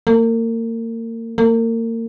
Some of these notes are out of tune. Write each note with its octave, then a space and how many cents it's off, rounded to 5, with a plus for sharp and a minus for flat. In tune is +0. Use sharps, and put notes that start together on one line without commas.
A#3 -35
A#3 -35